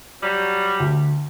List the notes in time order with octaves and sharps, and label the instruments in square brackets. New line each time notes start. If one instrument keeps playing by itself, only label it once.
[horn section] F#3 G3
[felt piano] D2